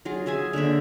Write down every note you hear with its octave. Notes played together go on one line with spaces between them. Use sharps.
F#3 F4 G#4
F4 G#4 E5 G#5
D3 A#3 C#5 E5